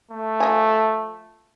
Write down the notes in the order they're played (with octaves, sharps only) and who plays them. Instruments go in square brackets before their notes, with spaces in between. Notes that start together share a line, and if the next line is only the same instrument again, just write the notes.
[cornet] A3
[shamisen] F3 D#5 G#5